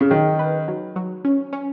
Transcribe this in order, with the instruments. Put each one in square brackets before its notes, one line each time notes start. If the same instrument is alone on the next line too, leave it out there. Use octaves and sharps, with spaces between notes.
[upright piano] C#3
[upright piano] D#3 [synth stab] F#3
[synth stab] B4
F#3
F#3
C#4
C#4